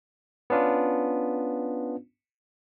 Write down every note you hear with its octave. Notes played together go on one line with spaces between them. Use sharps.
B3 C#4 D4 F4